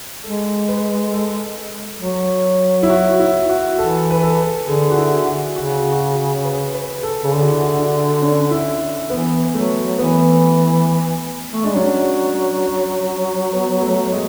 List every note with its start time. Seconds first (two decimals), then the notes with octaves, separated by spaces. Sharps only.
0.24 G#3 A4
0.68 B4
1.13 A4
2.01 F#3
2.83 E4
2.90 F#4
3.19 E4
3.49 F#4
3.78 E3 A4
4.11 B4
4.23 A4
4.67 D3 G#4
4.91 F#4
4.97 E4
5.26 F#4
5.56 C#3 F#4
5.92 F#4
6.00 G#4
6.44 B4
6.74 B4
7.03 A4
7.24 C#3
7.33 D3 G#4
7.42 F#4
7.51 E4
7.61 F#4
7.77 D4
8.22 C#4
8.51 E4
9.10 E3 B3
9.54 F#3 A3
9.99 E3 B3
11.53 A3
11.64 G#3 D4
11.76 F#3 C#4
13.53 B3
13.82 A3
14.12 G#3